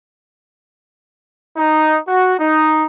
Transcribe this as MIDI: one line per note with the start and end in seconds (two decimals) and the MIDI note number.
1.56 1.98 63
2.08 2.34 66
2.39 2.86 63